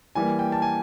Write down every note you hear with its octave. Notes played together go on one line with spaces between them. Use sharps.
E3 G3 A#3 G#5
G5
A5
G#5